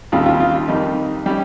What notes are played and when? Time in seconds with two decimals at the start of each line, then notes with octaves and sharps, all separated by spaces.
0.12 D#2 C#3 G3 C4 F4
0.26 F4
0.40 F4
0.55 F4
0.68 F2 D#3 G3 C4 D#4
1.26 G3 C#4